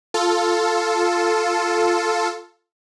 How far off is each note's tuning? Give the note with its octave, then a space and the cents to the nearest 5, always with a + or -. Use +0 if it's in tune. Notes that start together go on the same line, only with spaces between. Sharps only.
F4 +0 A4 +0